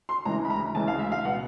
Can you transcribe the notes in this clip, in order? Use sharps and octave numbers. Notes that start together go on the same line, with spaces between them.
C6
D2 C#3 E3 G#3 A#5
B5
A#5
D2 C#3 E3 G#3 A5
F5
E5
F5
B2 G#3 B3 F#5